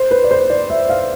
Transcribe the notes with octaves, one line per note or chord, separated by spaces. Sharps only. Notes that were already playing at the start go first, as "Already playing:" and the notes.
Already playing: C5
B4
D5
C5
D5
E5
F5